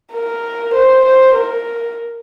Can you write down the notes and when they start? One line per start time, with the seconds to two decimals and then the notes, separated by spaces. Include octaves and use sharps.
0.13 A#4
0.74 C5
1.05 C5
1.35 A#4